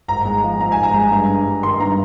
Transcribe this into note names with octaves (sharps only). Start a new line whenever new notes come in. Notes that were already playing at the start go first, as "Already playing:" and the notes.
G#1 A#5
G#3
F3
G#2 A#5
G#5
G#1
A#5
G#3
G2
D4
G3
D#3 C6
G2 A#5